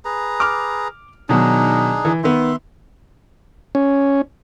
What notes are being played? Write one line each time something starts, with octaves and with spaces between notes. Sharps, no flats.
G#4 B4 A#5
D6 F6
B2 D#3 F#3 D4 D#4 G#4
E3
D#3 B3 E5 C6
C#4